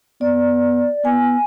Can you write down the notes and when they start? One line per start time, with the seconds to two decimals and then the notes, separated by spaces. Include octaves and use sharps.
0.21 B3 D5
1.05 B3 G#5